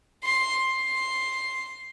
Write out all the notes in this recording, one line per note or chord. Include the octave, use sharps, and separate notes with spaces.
C6
C6